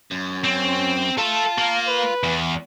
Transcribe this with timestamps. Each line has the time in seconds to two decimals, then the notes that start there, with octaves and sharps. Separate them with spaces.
0.11 F#2
0.44 C4 C#4
1.18 F4 A4 E5 A5
1.58 A#3
1.88 B4
2.24 E2